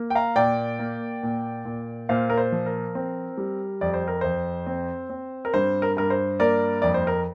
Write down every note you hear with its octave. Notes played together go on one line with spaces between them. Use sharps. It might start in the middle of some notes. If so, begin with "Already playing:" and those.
Already playing: A#3
G5
F5 A#5
A#2 D5 G5
A#3
A#2
A#2
A#2 C5 F5
A#4
C5
F3
A#4
C4
G3
F2 D5
C5
A#4
F2 C5
C4
C4
A#4
G2 C5
A#4
G2 A#4
C5
A#3 A#4 D5
F2 D5
C5
A#4